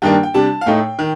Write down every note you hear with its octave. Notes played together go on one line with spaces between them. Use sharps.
G2 D#3 A#3 D4 G5
G5
C3 G3 D4 A5
F5
A2 A3 D#4 G5
D#3